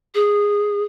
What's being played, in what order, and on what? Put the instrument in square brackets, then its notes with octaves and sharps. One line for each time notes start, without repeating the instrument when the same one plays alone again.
[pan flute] G#4